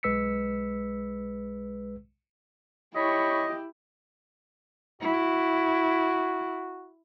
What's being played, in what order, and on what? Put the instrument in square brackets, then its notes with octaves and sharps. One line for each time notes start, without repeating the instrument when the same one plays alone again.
[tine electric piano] B1 G#3 B4 E6 B6 C#7
[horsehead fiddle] E4 G4 [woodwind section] C#5 B5 C#6 [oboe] D#5
[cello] E4 [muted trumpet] F#4